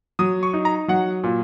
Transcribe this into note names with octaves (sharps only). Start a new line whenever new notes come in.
F#3 D#6
C#6
D#4
A#5
F#3 F#5
A#2